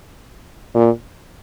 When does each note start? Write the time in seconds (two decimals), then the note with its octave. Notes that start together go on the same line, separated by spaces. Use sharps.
0.75 A#2